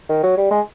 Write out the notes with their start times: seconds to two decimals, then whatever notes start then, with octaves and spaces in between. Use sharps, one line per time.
0.09 D#3
0.23 F#3
0.37 G3
0.51 G#3